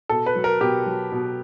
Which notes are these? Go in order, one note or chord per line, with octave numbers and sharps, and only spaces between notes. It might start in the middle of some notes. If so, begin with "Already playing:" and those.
B2 A4
B4
F#3
A#4
B2 G4
F#3
B2